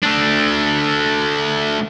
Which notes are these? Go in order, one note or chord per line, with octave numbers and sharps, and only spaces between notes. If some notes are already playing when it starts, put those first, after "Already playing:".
A3 D4